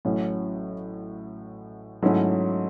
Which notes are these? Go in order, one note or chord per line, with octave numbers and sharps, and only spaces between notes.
A1 A2 F#3 C#4
G#2 F#3 A3 C#4 E4